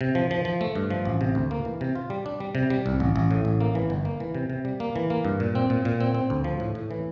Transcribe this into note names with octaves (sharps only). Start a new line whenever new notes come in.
C3
F3
F3
F3
A3
G2
F3
A1
C3
D2
A#3
E3
C3
F4
G3
D4
G3
C3
G3
C2
A1
A1
A2
A1
A#3
E3
G1
A#3
E3
C3
C3
G3
A#3
E3
A#3
G2
A#2
C4
A#2
A#2
C4
C4
D2
F3
A2
A2
E3